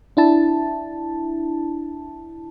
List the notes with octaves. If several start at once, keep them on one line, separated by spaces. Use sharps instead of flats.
D4 E4 A5